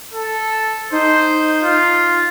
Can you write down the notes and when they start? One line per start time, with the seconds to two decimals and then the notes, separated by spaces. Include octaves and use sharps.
0.13 A4
0.93 D#4 C5
1.63 F4